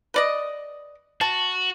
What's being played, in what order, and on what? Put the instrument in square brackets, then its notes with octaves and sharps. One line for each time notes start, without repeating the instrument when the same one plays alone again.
[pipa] B4 D5 D#5
[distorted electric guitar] F#4 [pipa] A5